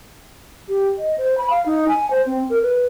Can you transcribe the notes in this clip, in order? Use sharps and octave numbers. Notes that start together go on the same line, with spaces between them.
G4
D#5
C5
B5
F5
D#4
G#5
C5
C4
A#4
B4